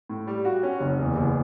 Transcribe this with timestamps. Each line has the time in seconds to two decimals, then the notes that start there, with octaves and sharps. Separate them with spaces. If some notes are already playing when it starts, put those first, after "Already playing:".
0.09 A2
0.27 G3
0.45 F#4
0.63 C#4
0.80 F#1
0.99 E2
1.15 F#1